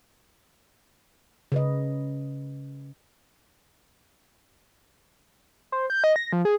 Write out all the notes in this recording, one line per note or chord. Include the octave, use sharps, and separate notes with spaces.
C#3 B4 D#5
C5
G6
D#5
A#6
F3
G#4